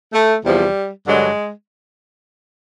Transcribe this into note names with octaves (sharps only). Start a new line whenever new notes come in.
A3
E2 C3 F3 G3
G2 D3 F#3 G#3